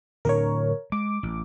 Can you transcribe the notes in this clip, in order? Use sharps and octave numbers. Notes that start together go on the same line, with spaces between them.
A2 D3 D4 A#4 C#5
G#3 D6
A1